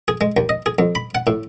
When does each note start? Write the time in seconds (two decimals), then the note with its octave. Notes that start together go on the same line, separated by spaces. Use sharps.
0.08 G#4
0.21 G#3
0.37 D#2
0.49 D#5
0.66 G#4
0.79 F2
0.95 B5
1.15 F#5
1.27 A2